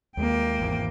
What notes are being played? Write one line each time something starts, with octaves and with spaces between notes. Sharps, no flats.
D#2 G#3 A#3 G5
G#1 E2